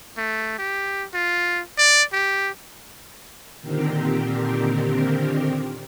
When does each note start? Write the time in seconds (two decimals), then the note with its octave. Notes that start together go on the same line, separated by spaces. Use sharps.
0.17 A3
0.59 G4
1.14 F4
1.78 D5
2.13 G4
3.61 A#2 D3 D#3 C4 G4 A#4